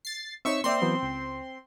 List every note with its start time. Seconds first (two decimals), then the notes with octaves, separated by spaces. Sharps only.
0.05 A6 C7
0.45 C4 D#4 C#5 E5 C#6 E6
0.64 A#3 C4 D5 E5 C6
0.82 E3 F#3 B3
1.03 C#2